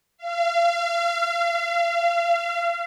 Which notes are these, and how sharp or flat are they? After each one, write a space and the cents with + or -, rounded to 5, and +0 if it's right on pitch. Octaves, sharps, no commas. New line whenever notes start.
F5 -35